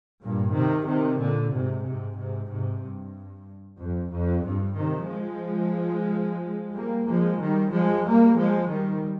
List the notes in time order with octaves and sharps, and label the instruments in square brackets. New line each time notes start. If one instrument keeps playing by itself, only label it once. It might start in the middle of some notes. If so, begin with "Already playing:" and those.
[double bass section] G2 A#2
C3 D#3
C3 D#3
A#2 D3
G#2 C3
G#2 C3
G#2 C3
G#2 C3
G2
F2
F2
G2
C3 D#3
F3 G#3
G3 A#3
F3 G#3
D#3 G3
F3 G#3
G3 A#3
F3 G#3
D#3 G3